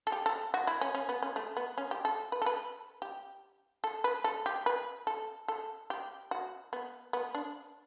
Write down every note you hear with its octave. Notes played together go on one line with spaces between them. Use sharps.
A4
G4
A4
F#4
E4
C#4
C#4
B3
C#4
A3
B3
C#4
G4
A4
B4
A4
B4
G4
A4
B4
A4
G4
B4
A4
A4
G4
F#4
B3
B3
D4